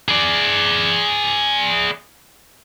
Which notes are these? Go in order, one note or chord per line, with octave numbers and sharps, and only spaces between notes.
G#4 D5